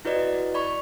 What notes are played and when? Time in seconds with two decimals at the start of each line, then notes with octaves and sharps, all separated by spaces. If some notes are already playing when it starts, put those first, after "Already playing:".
0.05 E4 F#4 B4 D5 D#5
0.54 D5 B5 C#6